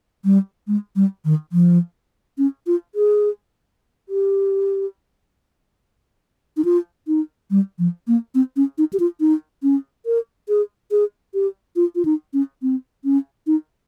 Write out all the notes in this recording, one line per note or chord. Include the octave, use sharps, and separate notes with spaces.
G3
G#3
G3
D#3
F3
C#4
F4
G#4
G4
D#4
F4
D#4
G3
F3
A#3
C4
C#4
D#4
G4
F4
D#4
C#4
A#4
G#4
G#4
G4
F4
F4
D#4
C#4
C4
C#4
D#4